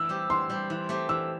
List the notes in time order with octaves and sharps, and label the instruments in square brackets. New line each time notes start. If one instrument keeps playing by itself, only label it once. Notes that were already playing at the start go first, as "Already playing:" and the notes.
Already playing: [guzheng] E3 [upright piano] E6
[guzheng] G3 C4 G4
[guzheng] E3 [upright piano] C6
[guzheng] G3 C4 G4
E3
A3 C4 G4
[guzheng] E3 [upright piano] E6